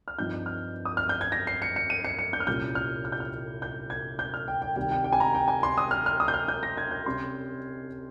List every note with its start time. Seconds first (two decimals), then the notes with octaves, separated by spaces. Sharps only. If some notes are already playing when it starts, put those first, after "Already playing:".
0.08 F6
0.18 G2 F3 C4 D#4 G6
0.46 F6
0.85 D#6
0.97 F6
1.09 G6
1.21 G#6
1.32 A#6
1.47 C7
1.62 C#7
1.76 C#7
1.90 D#7
2.05 C#7
2.19 C#7
2.33 G6
2.40 F6
2.47 C2 A#2 G3 C#4 G6
2.75 F6
3.05 F6
3.12 G6
3.20 F6
3.62 G6
3.90 G#6
4.19 G6
4.34 F6
4.48 G5
4.62 G5
4.76 C3 D#3 G3 G5
4.91 G5
5.04 G5
5.13 G#5
5.20 A#5
5.35 G5
5.48 G#5
5.63 C6
5.78 D#6
5.91 F6
6.06 F6
6.20 D#6
6.28 G6
6.34 F6
6.48 G6
6.63 A#6
6.77 G#6
6.91 G6
7.06 C3 G3 C#4 C6